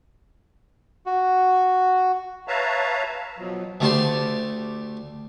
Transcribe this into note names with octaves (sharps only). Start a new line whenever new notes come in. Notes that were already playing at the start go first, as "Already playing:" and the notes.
F#4
B4 C#5 E5 F5 A5 A#5
B2 F3 F#3
D2 A3 G4 A5 C6